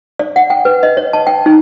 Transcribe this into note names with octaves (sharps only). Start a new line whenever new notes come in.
D5
F#5
G5
B4
D#5
C#5
A5
G5
D#4